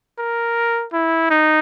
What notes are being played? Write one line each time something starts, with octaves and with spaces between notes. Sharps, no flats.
A#4
E4
D#4